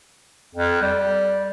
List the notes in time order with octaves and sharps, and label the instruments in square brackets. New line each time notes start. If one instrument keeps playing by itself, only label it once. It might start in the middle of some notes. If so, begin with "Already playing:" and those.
[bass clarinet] F2
G3